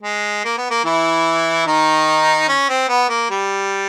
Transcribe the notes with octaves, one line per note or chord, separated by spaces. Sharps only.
G#3
A#3
B3
A#3
E3 E4
D#3 D#4
C#4
C4
B3
A#3
G3